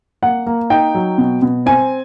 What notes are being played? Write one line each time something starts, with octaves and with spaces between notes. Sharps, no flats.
A#3 F#5
A#3
D#4 G5
F#3
B2
B2
C4 G#5